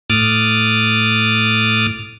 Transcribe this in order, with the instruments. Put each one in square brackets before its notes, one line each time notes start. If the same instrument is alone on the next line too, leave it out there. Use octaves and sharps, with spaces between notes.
[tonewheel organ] A2 D6 D#6 F6 F#6 A6